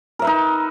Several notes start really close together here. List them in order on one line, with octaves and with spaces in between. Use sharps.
A#4 E5 B4 D#4